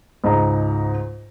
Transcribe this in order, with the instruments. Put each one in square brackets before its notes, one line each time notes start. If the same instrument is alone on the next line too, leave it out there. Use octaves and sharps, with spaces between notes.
[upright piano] C#2 G#2 D#4 D#5 A#5